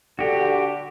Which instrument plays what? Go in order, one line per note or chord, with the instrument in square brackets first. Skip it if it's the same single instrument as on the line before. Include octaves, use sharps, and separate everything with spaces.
[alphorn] D3 [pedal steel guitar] F#4 G4